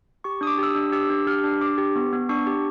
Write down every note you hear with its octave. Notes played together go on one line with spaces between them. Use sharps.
G4 C#6
D4 D#6
D6
G4 E6
D#6
D4
G4 E6
D4
G4 F6
D4
D4 D6
G4
B3
B3
D4 C#6
G4